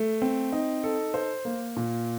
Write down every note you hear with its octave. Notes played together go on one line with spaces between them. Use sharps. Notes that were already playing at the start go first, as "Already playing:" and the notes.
Already playing: A3
C4
D#4
A4
C5
A#3
A#2